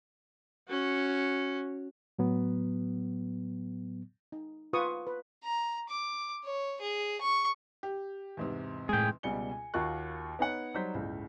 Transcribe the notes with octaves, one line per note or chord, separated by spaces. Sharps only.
C#4 F#4
A2 F#3 B3
D#4
F4 B4 C#6 D#6
B4
A#5
D6
C#5
G#4
C#6
G4
E2 G#2 C3
A2 G#3 G#4 G5
C#2 B2 G3 G#5 C#7 G7
G#5
D#2 F4 F#4 A#4 C#6 F#6
B3 D#4 C#5 F#5
F#3 G3 D#4 C5 G6 B6
G1 C#2 A2